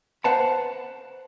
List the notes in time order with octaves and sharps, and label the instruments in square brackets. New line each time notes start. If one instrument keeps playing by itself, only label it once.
[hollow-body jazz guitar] B4 C5 F#5 A5 B5